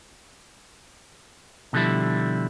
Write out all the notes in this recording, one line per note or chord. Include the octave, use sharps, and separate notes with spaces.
B2 D3 F3 G3 E4